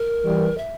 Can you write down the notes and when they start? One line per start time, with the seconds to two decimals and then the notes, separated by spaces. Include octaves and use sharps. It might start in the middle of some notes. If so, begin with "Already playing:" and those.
Already playing: A#4
0.24 E3 G3
0.58 E5